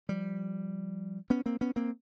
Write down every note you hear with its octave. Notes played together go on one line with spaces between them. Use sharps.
F3 G3
B3 C#4
A#3 C4
B3 C#4
A#3 C4